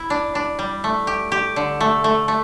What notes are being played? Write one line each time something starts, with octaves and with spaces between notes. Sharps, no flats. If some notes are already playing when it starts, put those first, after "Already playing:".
Already playing: E4
D4
D4
G3
A3
G4
G4
D3
A3
A3
A3